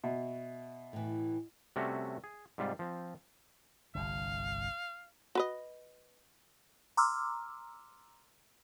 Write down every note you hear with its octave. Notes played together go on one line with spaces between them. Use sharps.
B2 E5
A2 E3
C3 G3 A3 C#4 F#4
G#4
G#2 C3 G3 F4
F3 C4
G1 C2 D3 F5
F#4 B4 D#5
A#5 C6 D6 E6 F6